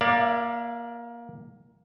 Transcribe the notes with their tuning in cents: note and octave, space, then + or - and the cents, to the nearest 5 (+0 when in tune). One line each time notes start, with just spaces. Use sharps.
A#3 +15 D5 +5 F5 -45